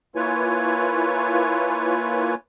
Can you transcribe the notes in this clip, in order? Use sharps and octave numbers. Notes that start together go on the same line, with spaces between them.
A#3 E4 F4 B4 C#5 G#5